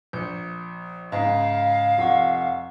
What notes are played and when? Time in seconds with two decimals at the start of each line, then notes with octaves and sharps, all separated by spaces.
0.13 A#1 G6 C#7
1.12 G#2 C#3 F5
1.98 F1 F4 F#5 C#6